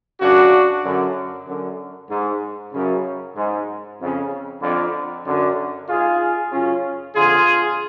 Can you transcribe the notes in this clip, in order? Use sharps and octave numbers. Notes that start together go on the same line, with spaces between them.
F#2 C#3 D4 F#4
F#2 D3
F#2 D3
G#2
F#2 C#3
G#2
F2 C#3
F2 D3
F#2 D3
G#2 F4 G#4
F#2 C#3 C#4 F4
F2 D3 F4 G#4